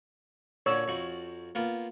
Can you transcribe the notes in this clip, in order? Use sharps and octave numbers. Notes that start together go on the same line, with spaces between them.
A#2 D3 C#5 E6
F2 F#4
A#3 B3 F4